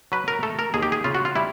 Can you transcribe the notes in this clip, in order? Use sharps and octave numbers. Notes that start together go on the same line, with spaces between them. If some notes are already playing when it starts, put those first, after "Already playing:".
F#3 B4
A#4
A3 A4
A#4
D#2 G#4
G4
G#4
C#3 F4
F#4
F4
G3 E4